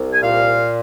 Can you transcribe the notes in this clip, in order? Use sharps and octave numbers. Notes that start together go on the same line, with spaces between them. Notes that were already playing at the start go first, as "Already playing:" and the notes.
Already playing: C2
G#5
A#2 F5